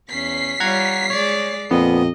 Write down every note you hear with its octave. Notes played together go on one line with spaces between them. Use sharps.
E2 C#4 B6 C7
G3 F4 C#5 F#5 A#5 G#6
G#3 C#5 D5
F2 A#2 B3 D#5